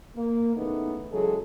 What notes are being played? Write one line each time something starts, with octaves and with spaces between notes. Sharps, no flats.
A#3
C#3 E3 A3 B3 D#4
C#3 E3 F#3 G#3 G#4 A4